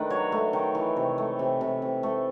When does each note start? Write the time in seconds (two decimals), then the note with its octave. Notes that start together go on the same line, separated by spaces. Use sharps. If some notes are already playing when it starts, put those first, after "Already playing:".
Already playing: D#3 A3 D4 B4
0.10 F#3 C#5
0.32 A3
0.53 D#3
0.75 E3
0.97 C3
1.18 A3
1.39 C3
1.61 C3
1.82 C3
2.03 A3